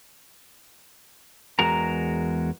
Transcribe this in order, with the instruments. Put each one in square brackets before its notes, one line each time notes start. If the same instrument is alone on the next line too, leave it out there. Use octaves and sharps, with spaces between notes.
[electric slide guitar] E2 G#3 F#4 A#4 A#5